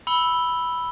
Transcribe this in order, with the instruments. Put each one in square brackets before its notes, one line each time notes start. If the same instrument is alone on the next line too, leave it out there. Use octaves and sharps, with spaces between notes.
[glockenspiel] B5 E6 C#7 G7